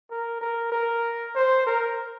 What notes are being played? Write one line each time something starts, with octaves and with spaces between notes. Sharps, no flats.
A#4
A#4
A#4
C5
A#4